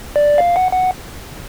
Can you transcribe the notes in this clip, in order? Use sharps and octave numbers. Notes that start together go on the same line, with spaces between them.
D5
F5
F#5
F#5